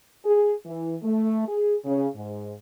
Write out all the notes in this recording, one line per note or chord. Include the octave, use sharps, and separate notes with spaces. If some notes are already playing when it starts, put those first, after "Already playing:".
G#4
E3
A3
G#4
C#3
G#2